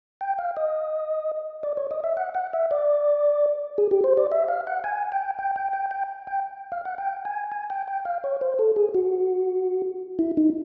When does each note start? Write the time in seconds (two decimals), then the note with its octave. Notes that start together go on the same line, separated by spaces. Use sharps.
0.21 G5
0.38 F5
0.57 D#5
1.63 D5
1.77 C#5
1.91 D#5
2.04 E5
2.17 F#5
2.35 F#5
2.53 E5
2.71 D5
3.78 G#4
3.91 G4
4.04 C5
4.17 D5
4.32 E5
4.48 F5
4.67 F#5
4.84 G#5
5.12 G5
5.39 G5
5.56 G5
5.73 G5
5.91 G5
6.27 G5
6.72 F5
6.85 F#5
6.98 G5
7.25 G#5
7.52 G#5
7.70 G5
7.87 G5
8.05 F5
8.24 C#5
8.41 C5
8.59 A4
8.76 G#4
8.94 F#4
10.19 E4
10.37 D#4